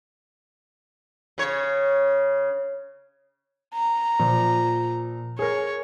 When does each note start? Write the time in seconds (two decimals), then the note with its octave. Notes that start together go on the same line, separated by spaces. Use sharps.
1.38 C#3 C#5
3.74 A#5
4.19 A#2 F3
5.39 G#4 A#4 C#5